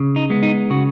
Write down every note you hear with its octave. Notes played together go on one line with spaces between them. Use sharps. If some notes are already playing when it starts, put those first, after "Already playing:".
Already playing: C#3
D#4
G#3 B3
D#4
C#3 F#4